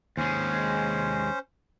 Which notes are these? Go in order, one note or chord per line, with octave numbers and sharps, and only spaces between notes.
D#2 G#3 C#4 C5